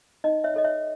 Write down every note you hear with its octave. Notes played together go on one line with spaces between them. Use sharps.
D#4 D#5
C#5 E5
A4 C#5 D#5
C#5 E5